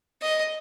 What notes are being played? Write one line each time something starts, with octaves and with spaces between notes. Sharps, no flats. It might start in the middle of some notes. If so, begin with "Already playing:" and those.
D#5